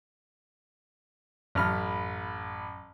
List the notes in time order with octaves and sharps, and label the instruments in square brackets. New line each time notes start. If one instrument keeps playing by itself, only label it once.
[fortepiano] A1 F6 [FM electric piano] F#2 B5